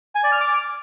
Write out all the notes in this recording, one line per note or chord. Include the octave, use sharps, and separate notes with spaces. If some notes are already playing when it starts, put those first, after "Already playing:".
G#5
D5
F6
D6